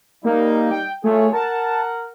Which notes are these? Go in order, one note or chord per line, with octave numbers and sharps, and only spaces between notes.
G3 A#3 D#4
G5
A3 F4 G#4 C#5
A#4 F#5 A5